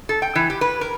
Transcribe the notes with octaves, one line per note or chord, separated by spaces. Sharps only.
A4
G5
E3
G4
B4
A#4